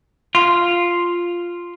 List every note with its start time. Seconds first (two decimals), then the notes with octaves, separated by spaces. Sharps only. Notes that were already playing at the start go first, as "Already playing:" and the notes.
0.35 F4